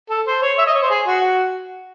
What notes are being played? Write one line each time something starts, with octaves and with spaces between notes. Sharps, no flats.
A4
C5
C#5
E5
D#5
C#5
C5
G#4
F#4